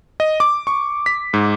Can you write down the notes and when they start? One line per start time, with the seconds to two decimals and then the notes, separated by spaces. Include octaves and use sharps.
0.20 D#5
0.40 D6
0.67 C#6
1.06 B6
1.34 G#2